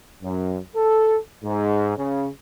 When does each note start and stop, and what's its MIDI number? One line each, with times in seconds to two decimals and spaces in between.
0.22 0.57 42
0.75 1.16 69
1.43 1.92 44
1.97 2.27 49